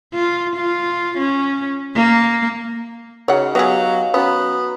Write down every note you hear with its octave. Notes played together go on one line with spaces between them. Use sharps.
F4
F4
C#4
A#3
C#3 D#4 F#4 C#5 F#5 A#5
F#3 B3 G4 G#4 F5 F#5
F#3 B3 C#4 B4 D#5